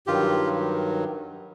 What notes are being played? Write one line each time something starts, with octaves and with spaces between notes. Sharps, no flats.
G2 D#3 F#3 F4 G4